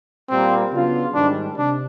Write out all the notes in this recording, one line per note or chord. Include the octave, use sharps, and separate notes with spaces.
A#2 G3 A#3 C4
C#3 F#3 B3 D4 F4
G#2 D#3 G3 D4
C3 D4